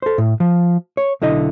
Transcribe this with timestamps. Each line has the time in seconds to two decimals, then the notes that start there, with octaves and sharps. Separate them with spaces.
0.02 A4 C5
0.18 A2
0.40 F3
0.97 C#5
1.21 B1 D3 E4 D#5